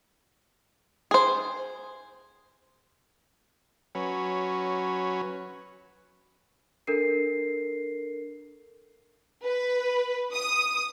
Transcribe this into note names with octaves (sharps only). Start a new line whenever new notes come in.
G#4 C5
F#3 C#4 B4
D4 A4 A#4 C7
B4
D#6